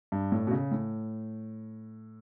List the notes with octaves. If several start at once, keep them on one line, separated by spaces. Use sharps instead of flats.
G2
A2
B2
C#3
A2